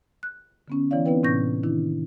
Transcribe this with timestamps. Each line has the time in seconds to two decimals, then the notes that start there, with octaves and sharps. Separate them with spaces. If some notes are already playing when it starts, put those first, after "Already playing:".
0.23 F#6
0.68 D3 B3 C#4
0.91 E3 B3 E4 C#5 D5 F5
1.05 B3 C4 D#4 E4 B4 G5
1.23 A2 C3 C#4 C#6 G6 A#6
1.63 D#3 D4 E4